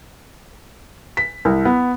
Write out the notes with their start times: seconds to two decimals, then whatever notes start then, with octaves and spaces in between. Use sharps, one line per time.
1.17 B6
1.45 C2
1.65 B3